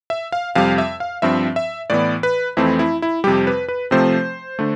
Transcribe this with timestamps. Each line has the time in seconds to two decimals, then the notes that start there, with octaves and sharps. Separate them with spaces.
0.10 E5
0.32 F5
0.55 F2 C3 G3 F5
0.78 E5
1.00 F5
1.22 G2 F3 C4 E5
1.56 E5
1.90 A2 E3 B3 D5
2.23 B4
2.57 F2 E3 A3 C4 E4
2.79 E4
3.02 E4
3.24 F2 C3 G3 G4
3.47 B4
3.69 B4
3.91 C3 F3 A3 C4 C5
4.59 D3 A3